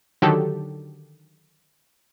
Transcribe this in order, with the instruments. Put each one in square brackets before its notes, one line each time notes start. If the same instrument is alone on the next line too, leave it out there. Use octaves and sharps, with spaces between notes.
[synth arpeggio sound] D3 D#3 F#3 D4 G4 A4